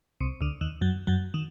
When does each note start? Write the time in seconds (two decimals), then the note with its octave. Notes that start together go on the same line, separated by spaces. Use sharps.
0.20 C2 C3
0.41 D2 D3
0.61 D#2 D#3
0.81 F#2 F#3
1.07 F#2 F#3
1.34 D#3